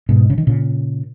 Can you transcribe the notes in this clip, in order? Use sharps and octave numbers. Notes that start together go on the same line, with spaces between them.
G#2 B2
C#3
D#3
A#2 C#3